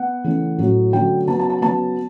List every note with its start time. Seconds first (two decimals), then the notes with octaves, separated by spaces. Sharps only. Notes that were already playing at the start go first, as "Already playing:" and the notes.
Already playing: B3 F#5
0.24 C#3 E3 A3 C#4
0.58 A2 F#3 C#4
0.93 D3 F#3 A3 C#4 G5
1.27 C#3 F#3 B3 A5
1.39 A5
1.50 A5
1.61 C#3 F#3 B3 A5